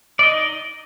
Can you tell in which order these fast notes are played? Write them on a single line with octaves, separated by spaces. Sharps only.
D5 D#5 D#4